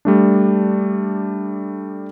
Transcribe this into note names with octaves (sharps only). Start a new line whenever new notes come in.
G3 A3 D4